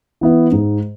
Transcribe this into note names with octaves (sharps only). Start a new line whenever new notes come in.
E3 B3 E4
G#2